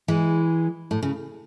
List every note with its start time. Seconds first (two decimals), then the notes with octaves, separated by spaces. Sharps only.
0.08 E3 G#3
0.91 A2
1.03 C#3